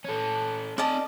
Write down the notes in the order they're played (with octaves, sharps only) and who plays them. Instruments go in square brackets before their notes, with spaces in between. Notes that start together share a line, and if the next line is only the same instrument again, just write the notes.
[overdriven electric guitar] C#4 A4
[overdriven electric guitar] C4 G#5 [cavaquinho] D5 D#5 A5